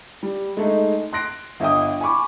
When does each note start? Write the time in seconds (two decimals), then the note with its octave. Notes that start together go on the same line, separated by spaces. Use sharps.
0.23 G3
0.57 G#3 A3 D#4
1.13 C6 F#6 A#6 D7
1.60 G1 D#5 E5 G5 D#6
2.01 G#5 B5 C#6 D6